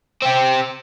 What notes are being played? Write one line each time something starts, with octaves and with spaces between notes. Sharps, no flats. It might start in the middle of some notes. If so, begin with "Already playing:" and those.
C4 G4